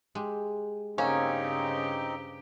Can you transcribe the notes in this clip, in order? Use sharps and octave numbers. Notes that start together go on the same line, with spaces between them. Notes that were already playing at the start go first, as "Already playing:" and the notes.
G#3 G4
G2 C#3 A#3 C4 C#4 D#4 F#4 G4